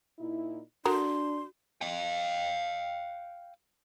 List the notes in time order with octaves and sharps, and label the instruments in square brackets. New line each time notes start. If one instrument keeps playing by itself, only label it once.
[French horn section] A#2 D#4 E4
[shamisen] D3 A#4 [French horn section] D4 [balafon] F#4 [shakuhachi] C6
[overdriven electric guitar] F5 G5